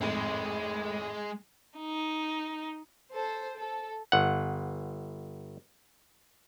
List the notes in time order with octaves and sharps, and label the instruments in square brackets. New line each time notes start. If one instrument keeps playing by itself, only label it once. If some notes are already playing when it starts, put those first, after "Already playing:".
[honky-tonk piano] G#1 F2 A2 [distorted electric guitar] G#3
[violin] D#4
[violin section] A4 C5
A4
[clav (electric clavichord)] G1 F#5